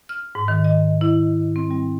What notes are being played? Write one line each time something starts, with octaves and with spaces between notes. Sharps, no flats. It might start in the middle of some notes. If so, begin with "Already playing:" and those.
F6
G#2
D#3
D#5
E4
C4
G3